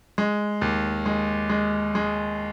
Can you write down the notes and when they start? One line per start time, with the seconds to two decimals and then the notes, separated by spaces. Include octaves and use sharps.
0.18 G#3
0.61 D#2
1.06 G#3
1.50 G#3
1.95 G#3